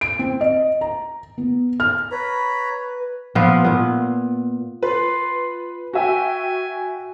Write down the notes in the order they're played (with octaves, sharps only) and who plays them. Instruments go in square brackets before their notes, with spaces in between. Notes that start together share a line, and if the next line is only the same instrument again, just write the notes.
[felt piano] D7
C4
D#5
A#5
B3
F6
[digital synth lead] B4 [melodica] C#5 A#5 B5
[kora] A#2 F3 B3 F5
A#2 B3
[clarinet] F4 [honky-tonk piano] B4
[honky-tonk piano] F#4 E5 G5 [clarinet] G#5